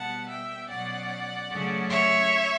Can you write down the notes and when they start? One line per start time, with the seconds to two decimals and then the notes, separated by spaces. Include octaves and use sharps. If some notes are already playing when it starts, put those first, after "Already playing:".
Already playing: B2 G3 B3 F#5 A5
0.29 E5 G5
0.69 B2 F#3 C#4 D5 F#5
1.50 C#3 F#3 A3 C#4
1.89 C#5 E5